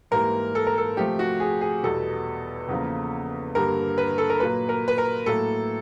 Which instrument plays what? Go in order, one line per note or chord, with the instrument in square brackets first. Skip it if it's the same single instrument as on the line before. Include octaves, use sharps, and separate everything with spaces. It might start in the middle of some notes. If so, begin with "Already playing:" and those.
[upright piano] G#2 E3 G3 A#3 A#4
A4
A#4
A4
C3 F3 A3 G4
F#4
G#4
G#4
E2 B2 G3 A4
E2 C#3 F3 A#3
G2 D3 G3 A#3 A#4
B4
A4
A#4
A#2 F#3 A#3 B4
A#4
B4
A#4
A2 F#3 A#3 A4